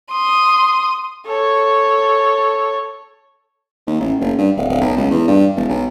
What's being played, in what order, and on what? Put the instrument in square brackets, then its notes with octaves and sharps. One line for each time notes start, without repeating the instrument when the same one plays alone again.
[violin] C6 D#6
[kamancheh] A4 C#5
[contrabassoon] D#2
A1
F#1
G2
D1
D1
B1
C#2
E2
G2
E1
B1